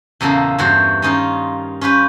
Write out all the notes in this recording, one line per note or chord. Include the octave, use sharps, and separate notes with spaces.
E2 A#2 C#3 A#3 A4
E2 G2 E3 F#4 C5 C#5
D#3 C#4 D#4 F4
C#4 F4 G4 B4